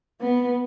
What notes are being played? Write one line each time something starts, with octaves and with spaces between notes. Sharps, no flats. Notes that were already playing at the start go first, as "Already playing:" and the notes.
B3